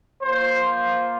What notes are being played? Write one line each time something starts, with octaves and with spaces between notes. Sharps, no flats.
A#3 F4 C5
C5